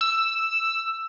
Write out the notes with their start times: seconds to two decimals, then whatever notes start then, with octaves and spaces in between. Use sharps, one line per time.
0.01 E6